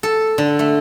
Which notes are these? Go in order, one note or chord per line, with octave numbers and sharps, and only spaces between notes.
A4
D3
A3